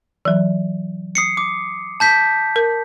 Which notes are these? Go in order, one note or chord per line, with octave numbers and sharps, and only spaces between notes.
E3 F#3
D#6 C7 C#7
D6
A5 G6 B6
A#4